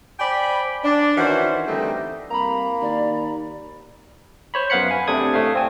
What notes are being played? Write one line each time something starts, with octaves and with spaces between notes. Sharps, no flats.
C5 D5 G5 G#5 B5
D4
D#3 E3 C#4 F#4 C5
D3 E3 G3 A3 C4 D#4
C2 A#3 A#5 B5
D#2 D5
C5 C#5 B5
F#2 B3 F5 F#5 B5 C#7
G#5
C3 A3 D4 D#6 G#6
A2 A3 F5
C4 G#5